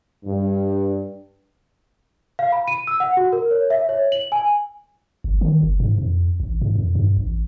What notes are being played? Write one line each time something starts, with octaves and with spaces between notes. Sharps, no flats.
G2
F5
B5
D#7
E6
F#5
F#4
A#4
C#5
E5
C#5
F#7
G#5
G1
D#3
F#1
G#2
F2
A1
G#2
F2
G2
A1